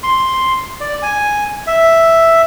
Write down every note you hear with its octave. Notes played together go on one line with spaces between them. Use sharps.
C6
D5
G#5
E5